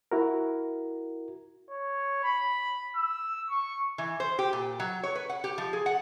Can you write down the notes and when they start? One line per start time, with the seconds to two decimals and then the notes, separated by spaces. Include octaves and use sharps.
0.12 E4 F#4 A#4
1.71 C#5
2.24 B5
2.97 E6
3.49 C#6
3.98 E3
4.20 C5
4.39 G4
4.53 A#2
4.80 F#3
5.03 C#5
5.15 B4
5.29 F#5
5.44 G4
5.58 F3
5.73 G#4
5.86 F#5